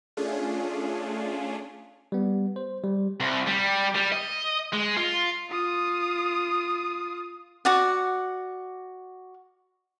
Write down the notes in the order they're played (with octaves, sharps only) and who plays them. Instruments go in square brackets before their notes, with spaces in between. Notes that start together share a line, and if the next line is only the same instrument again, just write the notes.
[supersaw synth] A3 C#4 D4 F4 G#4
[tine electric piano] G3 B3
C5
G3
[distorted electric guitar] C2
G3
G3
D#5
G#3
F4
[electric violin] F4 D#6
[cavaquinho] F#4 D5 F#5